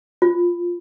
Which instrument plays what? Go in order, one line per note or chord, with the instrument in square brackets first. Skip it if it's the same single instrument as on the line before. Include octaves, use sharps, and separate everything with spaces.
[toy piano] F4